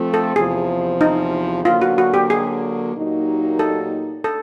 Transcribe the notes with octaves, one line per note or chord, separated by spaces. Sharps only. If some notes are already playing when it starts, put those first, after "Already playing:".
Already playing: F3 A3 C4
A4
E2 C3 F3 G#4
D#4
D3 F#3 A#3 F4
F#4
F#4
G4
G#4
A#2 F#3 A#3 D#4 G4
A4
A4